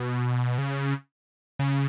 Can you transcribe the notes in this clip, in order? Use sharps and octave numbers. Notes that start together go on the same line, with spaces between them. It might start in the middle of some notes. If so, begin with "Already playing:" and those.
Already playing: B2
C#3
C#3